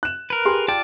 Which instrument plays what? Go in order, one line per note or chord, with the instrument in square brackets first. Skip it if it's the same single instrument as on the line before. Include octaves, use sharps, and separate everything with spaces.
[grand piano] F#6 E7
[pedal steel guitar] A#4 B4
[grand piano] G4 G#4 C6
[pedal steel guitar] F4 D5 A5 [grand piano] G5